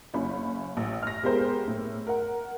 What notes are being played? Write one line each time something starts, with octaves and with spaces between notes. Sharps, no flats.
F#1 C#4 B5
A1
F6 A#6
G#3 B3 G4 A#4 C5
A2
A#4 F#5